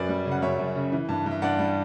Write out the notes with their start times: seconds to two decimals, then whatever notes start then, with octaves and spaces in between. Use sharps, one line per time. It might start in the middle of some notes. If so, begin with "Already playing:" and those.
Already playing: F#2 B4 D5
0.09 G3
0.26 C#3
0.31 F#5
0.42 F#2 C#5 E5
0.59 F#2
0.75 C#3
0.92 E3
1.09 G2
1.26 G2
1.31 E5
1.42 G2 D5 F#5
1.59 G3